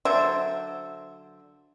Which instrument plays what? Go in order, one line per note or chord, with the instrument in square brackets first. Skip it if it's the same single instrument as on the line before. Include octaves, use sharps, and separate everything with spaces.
[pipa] D3 F#3 C5 E5